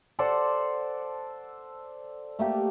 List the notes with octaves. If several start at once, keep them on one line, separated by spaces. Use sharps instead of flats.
A4 C5 D5 F#5
A3 A#3 G4